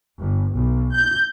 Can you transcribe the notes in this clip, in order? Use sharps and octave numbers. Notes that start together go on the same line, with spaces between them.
G1
B1
G6